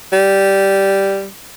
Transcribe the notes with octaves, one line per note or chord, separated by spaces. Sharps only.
G3